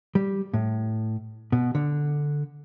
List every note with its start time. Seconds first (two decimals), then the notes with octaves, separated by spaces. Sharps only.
0.15 G3
0.54 A2
1.52 B2
1.75 D3